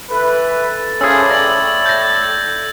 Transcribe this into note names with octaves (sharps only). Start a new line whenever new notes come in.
E3 A4 B4
E3 F3 A#3 C#4 G#4 E6 G#6
A2 D5 A#6 F#7
G6 A6 A#6